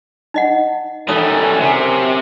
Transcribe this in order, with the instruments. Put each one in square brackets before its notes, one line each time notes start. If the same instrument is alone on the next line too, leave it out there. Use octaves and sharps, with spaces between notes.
[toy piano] D#4 D#5 F#5
[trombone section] F#2 [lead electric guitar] E3 G3 [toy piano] D#4 C#5 D#6 [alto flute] A4
[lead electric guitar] C3 [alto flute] G#5